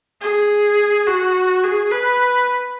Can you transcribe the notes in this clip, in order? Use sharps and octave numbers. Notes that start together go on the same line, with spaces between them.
G#4
F#4
G#4
B4